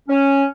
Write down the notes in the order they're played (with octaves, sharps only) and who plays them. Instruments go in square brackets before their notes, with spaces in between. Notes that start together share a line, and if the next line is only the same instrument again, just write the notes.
[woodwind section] C#4